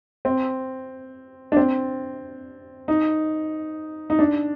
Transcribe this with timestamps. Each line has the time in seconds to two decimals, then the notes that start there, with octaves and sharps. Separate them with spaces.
0.25 C4
1.52 D4
1.57 C4
2.88 D#4
4.10 D#4
4.19 D4